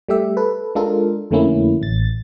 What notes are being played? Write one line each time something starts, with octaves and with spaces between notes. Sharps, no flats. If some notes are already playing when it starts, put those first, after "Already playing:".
G3 A3 G4 E5
A4 B4
G#3 D4 F4 A4 A#4
F2 D3 A3 A#3 C#4 E4
A1 A6